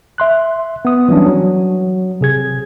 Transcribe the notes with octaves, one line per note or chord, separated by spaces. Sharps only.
E5 C6 F#6
B3 D#6
E3 F#3 G3 C#4 D4
F#3
C3 G#4 G#6